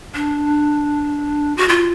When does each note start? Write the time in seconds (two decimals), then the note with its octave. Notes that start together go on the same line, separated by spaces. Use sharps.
0.15 D4
1.57 F#4
1.69 F4